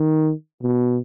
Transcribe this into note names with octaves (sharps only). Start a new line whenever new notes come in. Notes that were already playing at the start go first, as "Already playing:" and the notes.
Already playing: D#3
B2